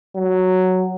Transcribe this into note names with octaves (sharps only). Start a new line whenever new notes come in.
F#3